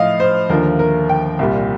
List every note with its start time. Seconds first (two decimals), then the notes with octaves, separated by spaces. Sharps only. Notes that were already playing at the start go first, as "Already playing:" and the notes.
Already playing: A2 F3 D#5 F5
0.20 C5
0.50 D#2 D3 F3 A#4
0.79 A#4
1.09 G5
1.39 C2 A#2 G3